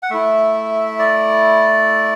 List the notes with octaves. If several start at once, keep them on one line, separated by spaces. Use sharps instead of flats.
F#5
A3 E4 E5
D5